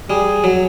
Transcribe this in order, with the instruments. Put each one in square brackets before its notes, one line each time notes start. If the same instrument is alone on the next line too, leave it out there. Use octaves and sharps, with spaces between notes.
[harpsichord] G3 [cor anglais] G#4
[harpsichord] F#3